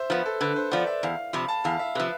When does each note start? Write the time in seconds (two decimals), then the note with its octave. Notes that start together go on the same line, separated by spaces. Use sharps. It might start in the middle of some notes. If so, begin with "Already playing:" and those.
Already playing: C5 E5
0.10 F3 B3 B4
0.26 A4
0.40 D3 B4
0.56 C5
0.71 F3 B3 D5
0.87 E5
1.03 E2 F5
1.33 C3 F3 B5
1.48 A5
1.64 E2 F5
1.79 E5
1.95 C3 F3 B4